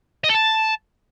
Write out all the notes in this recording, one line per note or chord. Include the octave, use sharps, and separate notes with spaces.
D#5
A4
A5